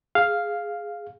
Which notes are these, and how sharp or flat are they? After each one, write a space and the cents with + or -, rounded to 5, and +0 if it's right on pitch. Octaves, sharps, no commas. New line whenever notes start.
G#4 +0 F5 +0